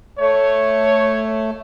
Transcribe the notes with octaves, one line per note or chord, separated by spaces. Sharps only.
A3 C#5